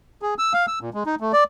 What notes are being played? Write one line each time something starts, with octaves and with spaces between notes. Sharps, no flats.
G#4
E6
F5
E6
A#2
G#3
D#4
A3
D5